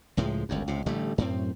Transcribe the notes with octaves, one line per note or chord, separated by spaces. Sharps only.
C#2 A2 F3 G#3
G1 C#2 F#2
C#2 C3
A1 D3 G3 A3
F#2 A2 C4